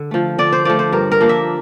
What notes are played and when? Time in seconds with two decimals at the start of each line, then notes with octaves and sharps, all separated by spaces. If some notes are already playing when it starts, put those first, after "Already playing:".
Already playing: D3
0.11 F3 A3
0.38 D3 D5
0.53 C5
0.65 F3 A3 D5
0.79 C5
0.92 G2 A#4
1.12 A#4
1.20 F3 A#3 D4
1.29 E5